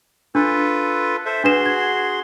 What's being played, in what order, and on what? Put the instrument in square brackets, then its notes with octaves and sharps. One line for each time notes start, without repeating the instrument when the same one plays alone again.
[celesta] D4 [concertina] F4 A4 B4
[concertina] A4 C5 E5
[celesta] D4 B4 E7 [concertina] F#4 G#4 C6
[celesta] G#6